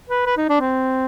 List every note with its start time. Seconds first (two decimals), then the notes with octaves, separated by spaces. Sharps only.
0.10 B4
0.26 B4
0.37 D#4
0.49 D4
0.60 C4